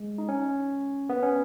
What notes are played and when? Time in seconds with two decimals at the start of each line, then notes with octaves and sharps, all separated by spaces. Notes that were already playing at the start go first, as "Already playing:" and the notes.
Already playing: G#3
0.18 D#4
0.29 C#4
1.09 B3
1.23 C#4